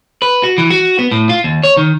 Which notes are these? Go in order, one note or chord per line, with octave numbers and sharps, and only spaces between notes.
B4
F#4
E3
F#4
B3
A2
F4
D#2
C#5
D#3